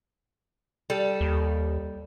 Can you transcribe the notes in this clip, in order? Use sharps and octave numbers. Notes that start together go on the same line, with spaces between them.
G3 A4
D#2